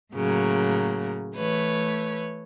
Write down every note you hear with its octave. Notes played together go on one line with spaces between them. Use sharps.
A2 C#3 F#3 A#3
E3 A3 B4 C#5